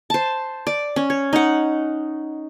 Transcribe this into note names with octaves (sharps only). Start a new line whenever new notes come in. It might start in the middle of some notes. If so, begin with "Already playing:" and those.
C5 A5
D5
C#4
C#5
D#4 F#5